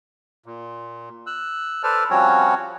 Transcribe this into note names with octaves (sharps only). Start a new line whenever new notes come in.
A#2
E6 F#6
A4 B4 C5 D5 A5 F6
F3 G3 C4 C#4 F#4 C#5